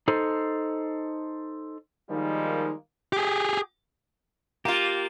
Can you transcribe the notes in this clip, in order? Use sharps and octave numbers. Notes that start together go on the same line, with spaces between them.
D#4 A4 C5
D#3 F3 G3 G#3 A#3 D#4
G4 G#4
A#3 F4 G4